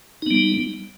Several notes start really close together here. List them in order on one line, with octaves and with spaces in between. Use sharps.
D#4 B3 G3